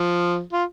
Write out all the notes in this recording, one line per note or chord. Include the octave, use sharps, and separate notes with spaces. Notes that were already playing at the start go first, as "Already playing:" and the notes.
Already playing: F3
F4